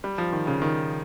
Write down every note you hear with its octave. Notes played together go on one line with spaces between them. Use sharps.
G3
F3
D#3
C#3
D#3